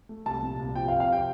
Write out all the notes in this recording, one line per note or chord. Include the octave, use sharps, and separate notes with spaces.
A3
C2 A5
A#2
C2
F3 G5
F5
F2
F5
C3 G5